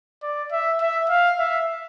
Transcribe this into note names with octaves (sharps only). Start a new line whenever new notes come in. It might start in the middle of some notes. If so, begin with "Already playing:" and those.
D5
E5
E5
F5
E5